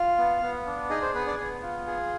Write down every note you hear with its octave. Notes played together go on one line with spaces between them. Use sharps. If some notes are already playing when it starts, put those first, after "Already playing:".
Already playing: F4 F5
B3
B3
D4
D#4 G#4 D#5
C5
B3 B4
D4 D5
B3
F4
G#4